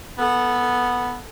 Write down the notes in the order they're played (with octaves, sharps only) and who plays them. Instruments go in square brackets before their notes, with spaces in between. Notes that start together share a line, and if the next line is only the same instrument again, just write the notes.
[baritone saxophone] B3 [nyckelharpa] A4